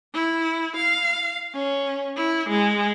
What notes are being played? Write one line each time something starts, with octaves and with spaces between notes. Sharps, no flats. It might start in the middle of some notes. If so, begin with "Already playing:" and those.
E4
F5
C#4
E4
G#3